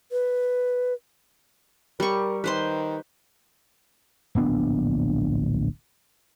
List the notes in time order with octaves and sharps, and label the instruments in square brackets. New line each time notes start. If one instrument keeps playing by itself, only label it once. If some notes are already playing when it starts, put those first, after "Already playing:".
[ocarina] B4
[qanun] G3 C#6 [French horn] A#4
[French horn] D#3 [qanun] B4 C5 C6
[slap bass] D1 A#1 B3 D4